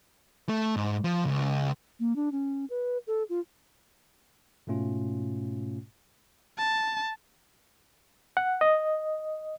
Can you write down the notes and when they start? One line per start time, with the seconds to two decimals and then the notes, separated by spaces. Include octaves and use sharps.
0.49 A3
0.76 G#2
1.04 F3
1.24 C#2
2.00 A#3
2.16 D4
2.32 C#4
2.70 B4
3.07 A4
3.29 F4
4.67 G#2 B2 A3 C#4 F4
6.58 A5
8.37 F#5
8.61 D#5